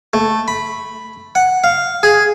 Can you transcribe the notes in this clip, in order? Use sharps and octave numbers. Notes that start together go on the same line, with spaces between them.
A3
B5
F#5
F5
G#4